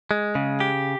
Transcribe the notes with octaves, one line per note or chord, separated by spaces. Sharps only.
G#3
C#3
G4